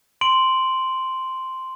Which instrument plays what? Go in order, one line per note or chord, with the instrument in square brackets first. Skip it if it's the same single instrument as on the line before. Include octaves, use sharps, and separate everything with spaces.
[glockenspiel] C6 D7 F#7